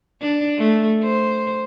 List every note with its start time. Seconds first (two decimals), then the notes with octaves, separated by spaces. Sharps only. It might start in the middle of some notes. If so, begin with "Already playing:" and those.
0.22 D4
0.58 A3
1.03 C5